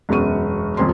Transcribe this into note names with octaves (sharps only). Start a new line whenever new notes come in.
E1 F#2 B3 C#6 D#7
D#1 F2 C6